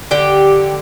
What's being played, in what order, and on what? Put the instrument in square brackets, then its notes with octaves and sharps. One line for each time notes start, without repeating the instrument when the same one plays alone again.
[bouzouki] D3 G4